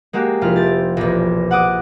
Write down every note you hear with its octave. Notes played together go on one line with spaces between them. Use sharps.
G#3 A#3 F#4 G4
F1 E4 F4 F6
C4 A6
E1 A#1
F#5 D6 D#6